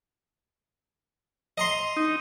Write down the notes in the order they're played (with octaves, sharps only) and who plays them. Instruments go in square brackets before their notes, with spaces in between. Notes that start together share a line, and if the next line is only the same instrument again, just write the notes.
[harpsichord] D#5 A#5 C6
[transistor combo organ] D#4